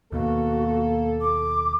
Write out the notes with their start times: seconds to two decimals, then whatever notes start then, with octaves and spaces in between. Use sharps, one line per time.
0.12 D#2 B2 A#3 F#4 A4
1.21 D6